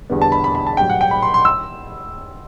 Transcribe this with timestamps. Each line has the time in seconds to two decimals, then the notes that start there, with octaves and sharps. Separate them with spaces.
0.10 E2 D3 G3 B3
0.22 A5
0.32 B5
0.44 B5
0.55 B5
0.67 A5
0.77 A1 G2 F#3 G5
0.89 F#5
1.01 G5
1.11 B5
1.22 C6
1.34 C6
1.45 E6